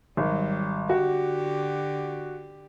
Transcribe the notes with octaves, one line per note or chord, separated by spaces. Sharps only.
G#1 F#3 G3
D3 F#4 G4